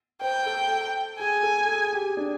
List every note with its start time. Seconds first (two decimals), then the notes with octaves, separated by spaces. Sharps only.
0.21 C5 G5
0.46 A4
1.19 G#4 G#5
1.43 A4
1.68 G#4
1.93 G4
2.17 D4